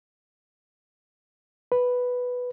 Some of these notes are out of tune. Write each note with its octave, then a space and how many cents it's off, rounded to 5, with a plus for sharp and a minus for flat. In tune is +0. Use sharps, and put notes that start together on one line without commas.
B4 +0